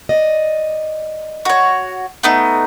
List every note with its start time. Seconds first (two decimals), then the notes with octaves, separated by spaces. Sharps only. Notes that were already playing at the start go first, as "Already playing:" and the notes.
0.09 D5 D#5
1.45 F#4 C#5
2.23 A3 B3 D#4